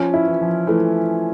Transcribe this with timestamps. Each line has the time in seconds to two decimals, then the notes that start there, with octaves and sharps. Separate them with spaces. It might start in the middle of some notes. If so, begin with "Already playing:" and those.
Already playing: F3 C#4
0.14 E4
0.27 E3
0.41 F3
0.67 E3 A3